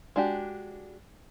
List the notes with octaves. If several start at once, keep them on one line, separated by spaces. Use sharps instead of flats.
G#3 D4 F#4 G4